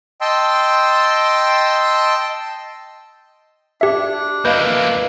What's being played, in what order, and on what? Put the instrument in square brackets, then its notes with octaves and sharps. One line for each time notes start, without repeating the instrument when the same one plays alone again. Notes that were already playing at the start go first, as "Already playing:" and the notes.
[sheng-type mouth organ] D#5 G5 A5 C6 E6
[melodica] D4 [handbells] G4 E5
[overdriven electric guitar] A#3 E4 [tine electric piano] B4 D#5 F5 [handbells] G6